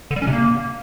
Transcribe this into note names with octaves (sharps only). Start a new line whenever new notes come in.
D3
G3
C#4
C3
A#3